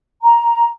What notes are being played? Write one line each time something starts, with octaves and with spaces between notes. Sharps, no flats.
A#5